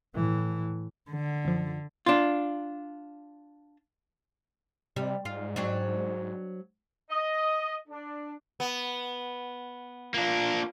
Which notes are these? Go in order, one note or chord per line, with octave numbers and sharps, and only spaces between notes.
A2 E3
D3
F#2 F3
D4 F4
C3 G3
G#2 F4
F#3 C4 D4
D#5
D4
B3
A#3 D4 F4